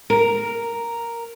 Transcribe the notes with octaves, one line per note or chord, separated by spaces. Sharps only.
A#4